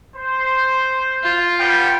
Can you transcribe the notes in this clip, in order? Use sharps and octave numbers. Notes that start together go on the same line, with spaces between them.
C5
F4
G3 B3 G5